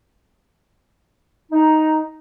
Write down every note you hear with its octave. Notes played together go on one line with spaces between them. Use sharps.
D#4